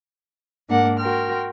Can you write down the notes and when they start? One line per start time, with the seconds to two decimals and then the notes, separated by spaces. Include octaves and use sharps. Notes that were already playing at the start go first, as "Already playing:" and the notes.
0.69 G#2 A#3 D4 A#4 F#5
0.98 F#4 A#4 G5 C6 F6